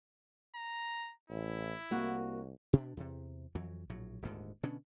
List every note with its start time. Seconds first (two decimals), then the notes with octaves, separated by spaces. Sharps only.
0.55 A#5
1.30 A1 E4
1.91 C2 A#3 F#4
2.73 B2 D4
2.97 E2 C3
3.55 F2 E3 F#3
3.89 A#1 A2 F#3
4.22 D#1 D2 G#2 D3
4.63 B2 D3 C#4 D4